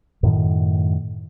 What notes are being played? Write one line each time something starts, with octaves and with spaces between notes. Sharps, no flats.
F#2 A2 D#3